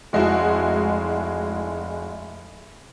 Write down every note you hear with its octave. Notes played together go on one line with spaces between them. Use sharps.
F1 G#3 E4 F#4